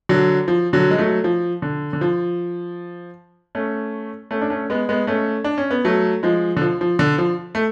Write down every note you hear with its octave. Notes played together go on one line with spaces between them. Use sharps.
D3 F#3
F3
D3 F#3
G#3
F#3 A3
F3
D3
D3
F3
A3 C#4
A3 C#4
D4
A3 C#4
G#3 B3
G#3 B3
A3 C#4
D4
C#4
B3
F#3 A3
F3 G#3
D3
F3
F3
D3
F3
A3